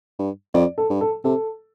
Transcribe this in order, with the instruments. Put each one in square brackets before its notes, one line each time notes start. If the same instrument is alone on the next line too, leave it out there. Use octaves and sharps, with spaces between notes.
[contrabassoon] G2
[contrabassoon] F2 [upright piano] D5
[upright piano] A4
[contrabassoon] G2
[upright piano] A4
[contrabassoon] C3 [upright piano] A4